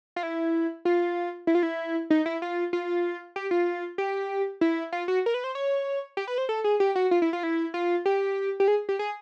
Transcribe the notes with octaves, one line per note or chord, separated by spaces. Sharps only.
F4
E4
F4
E4
F4
E4
D#4
E4
F4
F4
G4
F4
G4
E4
F4
F#4
A#4
B4
C5
C#5
G4
B4
C5
A4
G#4
G4
F#4
F4
E4
F4
E4
F4
G4
G4
G#4
G4
G#4